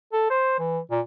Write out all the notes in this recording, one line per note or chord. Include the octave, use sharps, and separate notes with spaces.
A4
C5
E3
A#2